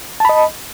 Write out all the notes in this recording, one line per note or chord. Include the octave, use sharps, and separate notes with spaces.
D#5 A5 B5